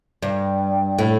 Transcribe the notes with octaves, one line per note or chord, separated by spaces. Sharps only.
G2
A2